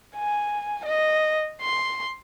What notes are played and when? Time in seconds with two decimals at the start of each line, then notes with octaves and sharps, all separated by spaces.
0.16 G#5
0.86 D#5
1.61 C6